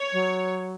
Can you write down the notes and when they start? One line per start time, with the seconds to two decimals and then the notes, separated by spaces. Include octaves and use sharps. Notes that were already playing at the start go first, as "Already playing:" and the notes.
Already playing: C#5
0.13 F#3